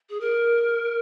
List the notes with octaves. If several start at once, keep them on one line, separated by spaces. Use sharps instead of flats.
G#4
A#4